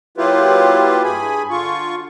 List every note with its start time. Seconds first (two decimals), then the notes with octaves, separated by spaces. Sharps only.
0.17 F#3 A#3 E4 F4 G4 B4
1.03 G2 G#4 G#5 B5
1.50 D3 F4 C#6